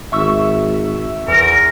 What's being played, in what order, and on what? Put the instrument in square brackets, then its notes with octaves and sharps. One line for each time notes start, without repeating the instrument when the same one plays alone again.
[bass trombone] G#1 [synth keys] E5 C#6 E6
[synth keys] E2 [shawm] A#4